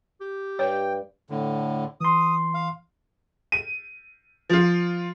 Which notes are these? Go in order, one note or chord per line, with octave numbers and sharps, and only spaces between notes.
G4
G2 C#5 G5
A2 D3
E3 C6 D#6
F5
D#7
F3 F4